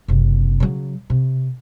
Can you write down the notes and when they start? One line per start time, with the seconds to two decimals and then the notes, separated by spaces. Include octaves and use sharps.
0.08 F#1 C3
0.60 C#3 F#3
1.10 C3